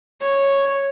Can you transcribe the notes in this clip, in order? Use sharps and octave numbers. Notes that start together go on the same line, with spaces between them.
C#5